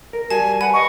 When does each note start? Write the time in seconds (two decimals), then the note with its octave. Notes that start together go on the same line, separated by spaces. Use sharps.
0.13 A#4
0.30 G3 F#4 G#5 A5
0.61 B4 F#5 G#5 B5
0.74 D#5 C#6